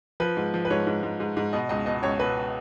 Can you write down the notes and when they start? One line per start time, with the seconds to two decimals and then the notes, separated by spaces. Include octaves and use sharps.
0.20 F3 B4
0.37 G#2
0.54 F3
0.65 B4
0.70 G#2 C#5
0.87 G#2
1.03 G#2
1.20 G#2
1.37 G#2
1.53 B2 D#5
1.69 C#2 D#5
1.86 B2 D#5
2.03 C#2 C#5
2.19 B2 B4